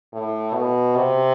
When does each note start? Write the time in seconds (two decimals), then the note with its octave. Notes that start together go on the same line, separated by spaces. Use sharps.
0.13 A2
0.55 B2
0.96 C3